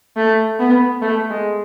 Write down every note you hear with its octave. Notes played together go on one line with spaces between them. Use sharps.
A3
B3
A3
G#3